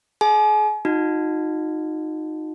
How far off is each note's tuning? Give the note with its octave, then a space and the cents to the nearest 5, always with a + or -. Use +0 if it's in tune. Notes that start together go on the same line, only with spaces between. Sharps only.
G#4 +35 G#5 +40
D#4 +0 F#4 -45